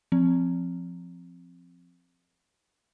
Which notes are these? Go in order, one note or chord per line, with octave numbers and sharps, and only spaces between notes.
F3 C4